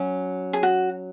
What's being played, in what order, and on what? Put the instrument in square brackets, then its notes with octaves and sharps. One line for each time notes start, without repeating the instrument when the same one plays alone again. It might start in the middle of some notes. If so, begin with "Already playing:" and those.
Already playing: [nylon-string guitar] F#3 C#4
[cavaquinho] G#4
F#4